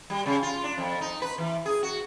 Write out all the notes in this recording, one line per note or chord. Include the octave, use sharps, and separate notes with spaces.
G3
C#3
F4
D4
F2
D#4
B4
E3
G#4
F#4